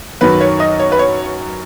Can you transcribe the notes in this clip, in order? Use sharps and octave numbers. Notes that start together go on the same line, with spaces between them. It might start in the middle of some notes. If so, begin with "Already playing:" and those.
F#2 D#3 F#3 B4
C#5
D#5
C#5
B4
C#5